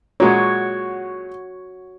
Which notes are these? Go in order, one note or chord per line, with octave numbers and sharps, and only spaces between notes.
A#2 G#3 F#4 C#5